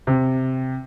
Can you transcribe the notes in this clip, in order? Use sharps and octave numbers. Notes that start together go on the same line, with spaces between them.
C3